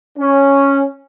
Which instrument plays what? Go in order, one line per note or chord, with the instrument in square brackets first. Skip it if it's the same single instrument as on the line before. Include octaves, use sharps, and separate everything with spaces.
[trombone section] C#4